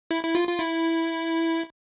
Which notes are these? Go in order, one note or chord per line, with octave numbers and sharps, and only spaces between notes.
E4
E4
F4
F4
E4